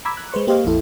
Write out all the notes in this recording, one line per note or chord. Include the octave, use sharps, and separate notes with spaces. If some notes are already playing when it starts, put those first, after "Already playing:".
A#5 B5 D6 E6 G#6 B6
F#6
G#3 B4 C5 C#6
A#3 G4 C5 D#5 F5
A#1 F2 E4 A4